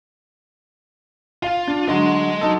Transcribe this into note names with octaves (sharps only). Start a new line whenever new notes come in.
F4 F5
D4
D3 F#3 G#3 D#5 C6
F#3 D#4 A4